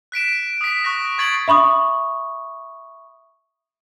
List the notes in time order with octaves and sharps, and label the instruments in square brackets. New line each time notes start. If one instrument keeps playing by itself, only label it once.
[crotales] F#6 B6 D7 E7
D#6 B6
C#6 D#6 F#6 A#6
C#6 G#6 A6 C7 D7 F#7
[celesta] E5 B5 C#6 D#6